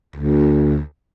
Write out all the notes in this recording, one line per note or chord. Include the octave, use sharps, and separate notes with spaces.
D2